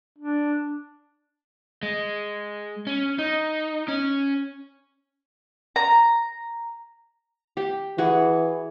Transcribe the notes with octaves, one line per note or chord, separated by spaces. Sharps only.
D4
G#3
C#4
D#4
C#4
A#5
G4
E3 F#4 G#4